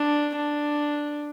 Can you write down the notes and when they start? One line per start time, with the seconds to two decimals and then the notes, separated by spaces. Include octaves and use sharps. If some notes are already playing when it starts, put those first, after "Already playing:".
Already playing: D4
0.35 D4